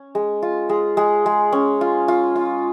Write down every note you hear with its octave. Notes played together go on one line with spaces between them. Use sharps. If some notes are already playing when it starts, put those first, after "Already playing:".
Already playing: C#4
G#3
F4
G#3
G#3
G#3
C#4
F4
F4
F4